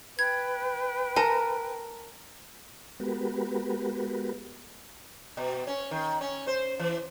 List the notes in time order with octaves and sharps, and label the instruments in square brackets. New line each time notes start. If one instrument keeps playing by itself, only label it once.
[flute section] B4 G5 [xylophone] G#6
[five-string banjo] A4 A#5 [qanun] A#4 [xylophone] G#5
[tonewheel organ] G#3 B3 F#4 G4 A#4 B4
[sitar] B2
C#4
D#3
C#4
C5
E3